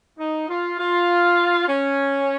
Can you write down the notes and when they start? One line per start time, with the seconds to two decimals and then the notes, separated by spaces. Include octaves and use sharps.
0.19 D#4
0.48 F4
0.79 F4
1.68 C#4